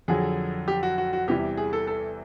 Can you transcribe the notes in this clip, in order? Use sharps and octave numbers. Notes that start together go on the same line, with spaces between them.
F2 D3 F#3 G#4
G4
F#4
F#4
F#4
E2 C3 E3 G3 G4
G#4
A4
A4